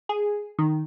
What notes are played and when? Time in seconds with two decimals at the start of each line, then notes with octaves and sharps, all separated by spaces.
0.09 G#4
0.59 D#3